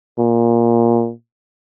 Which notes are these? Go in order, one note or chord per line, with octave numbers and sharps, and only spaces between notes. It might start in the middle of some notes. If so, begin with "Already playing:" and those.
A#2